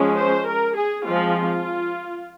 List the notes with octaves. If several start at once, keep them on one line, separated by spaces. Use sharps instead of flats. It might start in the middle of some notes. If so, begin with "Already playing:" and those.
Already playing: F3 G#3 C#4
C5
A#4
G#4
F3 G#3 C4 F4
F4